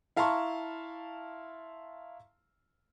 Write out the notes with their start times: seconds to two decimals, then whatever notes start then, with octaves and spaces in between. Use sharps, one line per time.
0.16 E4 F5 A5 A#5 C6 C#6